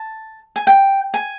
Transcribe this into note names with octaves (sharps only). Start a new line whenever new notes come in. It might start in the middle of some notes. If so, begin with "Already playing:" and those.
Already playing: A5
G#5
G5
G#5